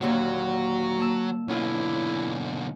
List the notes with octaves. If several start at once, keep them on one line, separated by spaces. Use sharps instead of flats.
D#2 A#2 D3 F#3 F#4
A#3 A5 E6
B1 D3 C#4 E4 F4